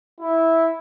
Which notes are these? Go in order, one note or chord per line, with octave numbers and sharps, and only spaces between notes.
E4